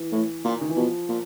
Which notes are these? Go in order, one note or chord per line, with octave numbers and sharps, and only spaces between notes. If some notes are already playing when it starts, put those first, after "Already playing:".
Already playing: E3
A2
A#2
D#3
E3
B2 F3
A#2